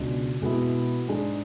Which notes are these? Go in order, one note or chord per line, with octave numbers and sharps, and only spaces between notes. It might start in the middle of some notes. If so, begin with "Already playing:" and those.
Already playing: C#2 B2 G#3 D4
B2 G#3 B3 E4
G#2 G#3 D4 G#4